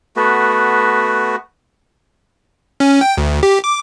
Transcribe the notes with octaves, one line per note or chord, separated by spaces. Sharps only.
A3 B3 F#4
C#4
G5
D2
G4
D6